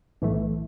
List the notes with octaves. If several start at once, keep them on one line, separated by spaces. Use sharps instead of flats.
B1 A2 E3 A3